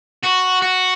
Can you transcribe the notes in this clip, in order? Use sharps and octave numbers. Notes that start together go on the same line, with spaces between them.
F#4
F#4